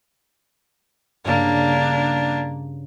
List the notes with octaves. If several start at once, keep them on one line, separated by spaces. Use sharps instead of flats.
G2 C#3 A#3 D4